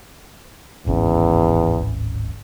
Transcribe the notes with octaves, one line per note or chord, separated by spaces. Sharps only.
D1 G#1 E2 C#4